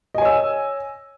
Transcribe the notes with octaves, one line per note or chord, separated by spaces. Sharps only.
C#5 D#5 G#5 E6